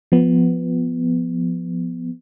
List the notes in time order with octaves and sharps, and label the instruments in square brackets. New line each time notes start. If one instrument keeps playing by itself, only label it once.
[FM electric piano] F3 B3